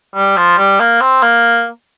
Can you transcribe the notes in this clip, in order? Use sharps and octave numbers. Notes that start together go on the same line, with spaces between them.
G3
F3
G3
A#3
C4
A#3